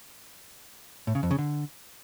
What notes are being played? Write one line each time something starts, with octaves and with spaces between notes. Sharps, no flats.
A2
C#3
F2
C#3
D3